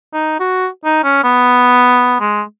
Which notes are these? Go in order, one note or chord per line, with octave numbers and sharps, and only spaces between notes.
D#4
F#4
D#4
C#4
B3
G#3